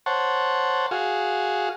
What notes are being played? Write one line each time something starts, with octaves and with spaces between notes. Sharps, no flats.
C5 C#5 F#5 A5
F#4 G#4 F5